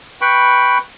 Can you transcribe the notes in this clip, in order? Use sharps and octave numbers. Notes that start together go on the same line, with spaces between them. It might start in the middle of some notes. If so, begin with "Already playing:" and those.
B4 G5 B5 C#6